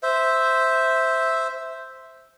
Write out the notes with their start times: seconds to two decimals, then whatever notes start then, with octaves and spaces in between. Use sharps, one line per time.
0.03 C5 E5